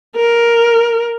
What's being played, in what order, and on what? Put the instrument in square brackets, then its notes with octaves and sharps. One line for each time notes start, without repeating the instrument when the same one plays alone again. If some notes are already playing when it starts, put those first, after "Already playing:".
[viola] A#4